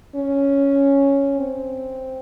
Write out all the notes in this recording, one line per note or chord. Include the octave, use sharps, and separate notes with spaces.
C#4
C4